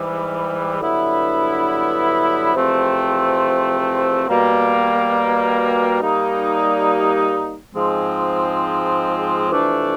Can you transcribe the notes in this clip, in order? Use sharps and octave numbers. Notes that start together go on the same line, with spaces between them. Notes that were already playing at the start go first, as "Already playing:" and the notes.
Already playing: G#2 E3 G3
G2 D3 F#3 B3 E4
E2 C3 F3 A3 C4
B2 G3 A#3
G3 A#3 D#4
G#2 F3 G#3 C4
F2 C3 E3 A3 D4